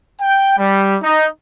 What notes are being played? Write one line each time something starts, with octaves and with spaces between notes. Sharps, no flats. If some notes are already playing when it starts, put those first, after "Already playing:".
G5
G3
D#4